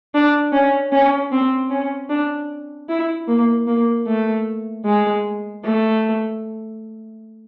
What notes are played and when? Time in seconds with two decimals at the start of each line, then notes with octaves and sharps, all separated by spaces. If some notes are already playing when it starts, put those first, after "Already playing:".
0.14 D4
0.52 C#4
0.92 C#4
1.32 C4
1.70 C#4
2.10 D4
2.89 E4
3.28 A#3
3.67 A#3
4.07 A3
4.85 G#3
5.64 A3